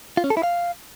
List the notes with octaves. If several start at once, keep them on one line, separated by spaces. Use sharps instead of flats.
F4
C#4
A4
E4
F5